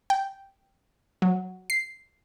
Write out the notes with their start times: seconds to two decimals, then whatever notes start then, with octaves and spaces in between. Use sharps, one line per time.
0.10 G5
1.22 F#3
1.70 C7